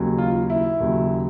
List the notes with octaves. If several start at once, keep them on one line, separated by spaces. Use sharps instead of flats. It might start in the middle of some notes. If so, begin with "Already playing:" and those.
Already playing: D#2 C#3 F#3
F4
E4
D#2 C#3 F#3